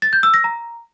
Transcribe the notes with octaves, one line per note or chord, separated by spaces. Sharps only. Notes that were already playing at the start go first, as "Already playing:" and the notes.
A6
G6
E6
A#6
A#5